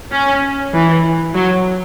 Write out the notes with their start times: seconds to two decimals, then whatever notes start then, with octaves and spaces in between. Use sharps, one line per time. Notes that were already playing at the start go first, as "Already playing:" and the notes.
0.12 C#4
0.73 E3
1.34 F#3